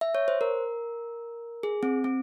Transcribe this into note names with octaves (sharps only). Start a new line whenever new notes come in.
E5
C#5
C5
A#4
G#4
C4
C4